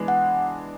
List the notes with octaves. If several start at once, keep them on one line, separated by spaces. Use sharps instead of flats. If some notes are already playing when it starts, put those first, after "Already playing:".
Already playing: E3 G#3 B3 D4
F#5